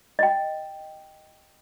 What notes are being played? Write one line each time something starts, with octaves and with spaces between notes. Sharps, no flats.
D#5 G5